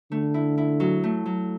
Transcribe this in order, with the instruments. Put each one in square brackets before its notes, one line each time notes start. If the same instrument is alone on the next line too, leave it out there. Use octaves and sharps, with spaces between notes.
[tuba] D3 [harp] A3
[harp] E4
E4
F#3
A3
F#3